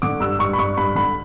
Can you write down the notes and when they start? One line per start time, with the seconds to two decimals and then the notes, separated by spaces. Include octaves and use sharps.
0.02 D3 D6
0.20 G2 E6
0.39 G2 C#6
0.53 B5
0.58 G2 C#6
0.77 G2 B5
0.95 D3 B5